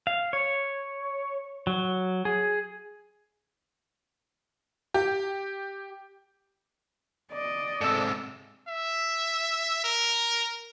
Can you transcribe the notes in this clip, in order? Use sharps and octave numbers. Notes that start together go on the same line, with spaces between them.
F5
C#5
F#3
G#4
G4
D5 D#5
G#2 C3 A4
E5
A#4